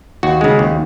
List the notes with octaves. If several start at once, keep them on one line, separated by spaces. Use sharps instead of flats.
D#2 F#4
C#3 G#3
D#2